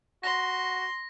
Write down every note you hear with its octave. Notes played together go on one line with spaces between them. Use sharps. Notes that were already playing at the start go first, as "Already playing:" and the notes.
F#4 C6 A#6